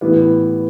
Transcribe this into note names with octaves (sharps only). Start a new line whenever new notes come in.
A2 E3 G3 B3